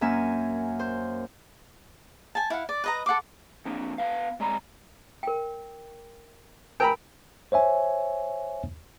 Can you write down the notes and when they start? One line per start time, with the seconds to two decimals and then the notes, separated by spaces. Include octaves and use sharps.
0.01 F#2 A#3 E5 G#5
0.79 C5
2.35 G#5 A5
2.50 E4 F5 F#5
2.69 D5
2.84 B4 D#5 A#5
3.06 A4 F#5 C6 D6
3.66 F3 A#3 C4 D4
3.98 B3 B4 F5
4.40 G#3 D5 A#5 B5
5.23 A#4 G5
6.80 A#4 B4 G5 G#5 A#5 B5
7.52 C5 C#5 E5 G#5